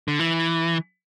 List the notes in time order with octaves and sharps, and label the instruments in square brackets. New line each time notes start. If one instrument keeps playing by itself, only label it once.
[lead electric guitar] D3
E3